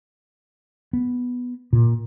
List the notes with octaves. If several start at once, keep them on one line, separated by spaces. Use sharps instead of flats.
B3
A#2